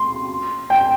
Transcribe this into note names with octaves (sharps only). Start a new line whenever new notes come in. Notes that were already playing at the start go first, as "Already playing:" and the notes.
Already playing: C6
G5